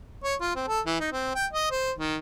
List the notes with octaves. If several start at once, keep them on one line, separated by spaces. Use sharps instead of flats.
C#5
F4
C4
A4
E3
D#4
C4
G5
D#5
C5
D#3